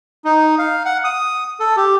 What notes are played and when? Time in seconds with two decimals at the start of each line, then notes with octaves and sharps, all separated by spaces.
0.25 D#4
0.59 F5
0.85 F#5
1.04 D#6
1.60 A4
1.77 G4